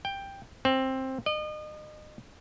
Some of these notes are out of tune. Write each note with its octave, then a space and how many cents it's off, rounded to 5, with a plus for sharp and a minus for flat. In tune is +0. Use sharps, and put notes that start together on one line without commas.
G5 +10
C4 +10
D#5 -35